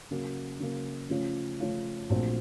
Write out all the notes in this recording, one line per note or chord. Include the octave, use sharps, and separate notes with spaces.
C#3 F#3 A#3
C#3 F#3 A#3
C#3 F3 A3 C#4 F4
C#3 F3 A3 C#4 F4
A#1 A#2 F#3 A3 C4